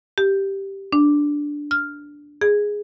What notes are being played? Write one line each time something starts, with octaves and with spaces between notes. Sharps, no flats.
G4
D4
F6
G#4